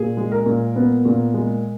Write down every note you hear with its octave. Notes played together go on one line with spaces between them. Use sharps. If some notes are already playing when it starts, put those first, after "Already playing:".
Already playing: A#2 G#4
G#3
A#4
A#2
B3
A#2
G#3